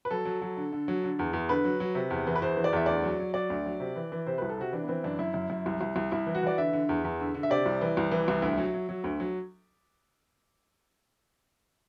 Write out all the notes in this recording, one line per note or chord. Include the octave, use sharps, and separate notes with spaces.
B4
F#3 A4
F#3
F#3
D3
D3
F#3
D3
E2
E2
D3 B4
F#3
F#3
C3
E2
E3
B4
E2 C5
E3
D5
E2 E5
D2 D5
F#3
F#3
F#3 D5
D2
F#3
C3
E3
E3
C3 C5
C2 B4
A4
C3 F#4
E3 D4
B3
E3 C4
F#2 D4
F#2 E4
F#2
F#2
C2
C2
C2
C2 E4
E3
F#4
E3 D5
D3 E5
D3
E2
E2
D3
D3
E5
C3 D5
C2
E3
C2
E3
C2
D2 E5
F#3
F#3
F#3
D2
F#3